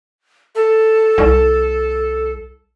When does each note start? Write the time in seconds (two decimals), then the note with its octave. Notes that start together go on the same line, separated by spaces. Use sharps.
0.55 A4
1.18 C2